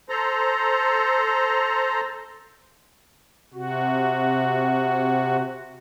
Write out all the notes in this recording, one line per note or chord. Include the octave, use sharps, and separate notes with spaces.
A4 C5 A#5
C3 F#4